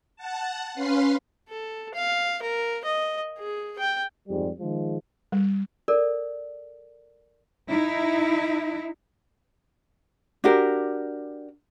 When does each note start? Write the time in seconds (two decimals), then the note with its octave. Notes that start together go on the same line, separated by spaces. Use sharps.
0.16 F#5 A5
0.74 C#4 B4 F5 C6 C7
1.49 A4
1.95 F5
2.42 A#4
2.85 D#5
3.39 G#4
3.79 G5
4.28 F2 G#2 G3
4.60 D#3 F3 G#3
5.32 G3
5.88 A4 A#4 D5
7.68 D#4 E4
10.44 D4 F#4 G4 A#4